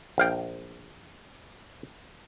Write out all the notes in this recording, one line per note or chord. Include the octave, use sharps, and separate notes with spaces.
A#1 F5 G5